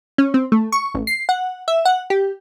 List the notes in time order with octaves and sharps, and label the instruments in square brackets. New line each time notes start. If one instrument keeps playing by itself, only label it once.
[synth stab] C#4
C4
A3
C#6
A1
C7
F#5
E5
F#5
G4